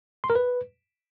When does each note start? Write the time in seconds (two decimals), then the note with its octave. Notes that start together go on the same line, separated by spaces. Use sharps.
0.24 C6
0.30 A#4
0.35 B4